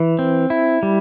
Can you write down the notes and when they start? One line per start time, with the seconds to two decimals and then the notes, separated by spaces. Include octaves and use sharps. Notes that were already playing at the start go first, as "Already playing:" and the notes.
Already playing: E3
0.19 C4
0.50 E4
0.83 G3